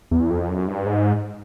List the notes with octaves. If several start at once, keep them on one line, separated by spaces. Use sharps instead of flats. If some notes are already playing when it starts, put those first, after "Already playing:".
E2
F2
F#2
G2
G#2